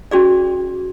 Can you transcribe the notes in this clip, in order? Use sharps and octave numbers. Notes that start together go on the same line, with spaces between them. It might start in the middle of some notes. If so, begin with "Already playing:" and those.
C#4 F#4 G#4 D5